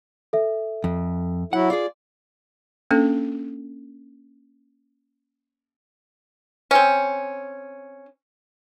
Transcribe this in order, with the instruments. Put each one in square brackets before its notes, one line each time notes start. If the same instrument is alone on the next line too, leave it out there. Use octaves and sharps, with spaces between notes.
[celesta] A4 E5
[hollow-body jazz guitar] F2
[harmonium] F#3 E4 [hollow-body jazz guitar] F#5
[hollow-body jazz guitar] F4 G#4 [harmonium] D5
[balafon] A#3 C#4 D4 A4
[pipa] C4 C#4